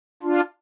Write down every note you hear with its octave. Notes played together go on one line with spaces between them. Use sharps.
D4 F4